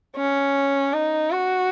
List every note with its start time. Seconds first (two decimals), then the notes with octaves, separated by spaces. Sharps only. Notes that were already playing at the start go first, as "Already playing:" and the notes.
0.16 C#4
0.93 D#4
1.31 F#4